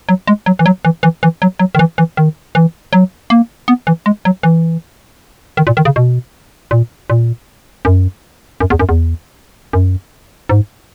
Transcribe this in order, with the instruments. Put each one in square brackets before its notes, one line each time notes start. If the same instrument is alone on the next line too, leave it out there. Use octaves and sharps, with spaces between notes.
[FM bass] F#3
G#3
F#3
E3
F#3
E3
E3
E3
F#3
F#3
D#3
E3
E3
D#3
E3
F#3
A#3
B3
E3
G#3
F#3
E3
D#3
A#2
D#3
C#3
B2
A#2
A#2
F#2
F#2
E2
F#2
E2
F#2
G#2